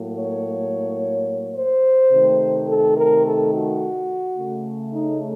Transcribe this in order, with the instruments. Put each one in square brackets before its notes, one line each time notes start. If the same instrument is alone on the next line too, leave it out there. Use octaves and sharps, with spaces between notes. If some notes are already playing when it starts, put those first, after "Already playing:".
Already playing: [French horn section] A2 F#3 A#3
C#5
C5
C3 D#3 A3
A4
A#4
A4
F#4
C#3 A3
D#4